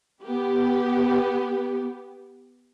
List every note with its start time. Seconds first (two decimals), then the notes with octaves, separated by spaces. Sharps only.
0.24 B3 G4